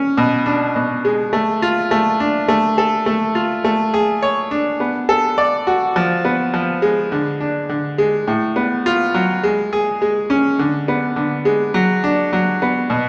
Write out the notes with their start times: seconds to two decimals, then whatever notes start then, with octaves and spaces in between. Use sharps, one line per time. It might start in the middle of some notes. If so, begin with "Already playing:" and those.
Already playing: C#4
0.17 B2
0.46 D4
0.76 B2
1.05 G#3
1.33 A3
1.62 F4
1.91 A3
2.20 D4
2.48 A3
2.78 A4
3.06 A3
3.35 F4
3.64 A3
3.94 G#4
4.22 C#5
4.51 D4
4.80 B3
5.09 A4
5.38 D5
5.67 F#4
5.96 F3
6.25 B3
6.54 F3
6.82 G#3
7.12 D3
7.41 D4
7.69 D3
7.98 G#3
8.27 A2
8.56 B3
8.86 F4
9.14 F#3
9.44 G#3
9.73 G#4
10.02 G#3
10.30 C#4
10.59 D3
10.88 B3
11.16 D3
11.45 G#3
11.74 F#3
12.04 D4
12.33 F#3
12.62 B3
12.90 B2